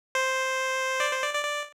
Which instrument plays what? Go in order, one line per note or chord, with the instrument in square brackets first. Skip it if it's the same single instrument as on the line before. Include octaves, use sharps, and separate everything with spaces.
[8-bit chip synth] C5
D5
C5
D5
D5
D5